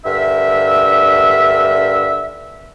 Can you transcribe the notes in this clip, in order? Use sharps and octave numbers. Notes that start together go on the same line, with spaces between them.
G2 D3 A#4 E5